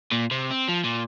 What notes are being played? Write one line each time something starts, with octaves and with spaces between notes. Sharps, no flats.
A#2
C3
C4
F3
A#2